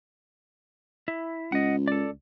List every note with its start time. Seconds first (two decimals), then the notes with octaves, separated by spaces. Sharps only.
1.08 E4
1.52 C#2 D#5 F#5
1.88 A4 D5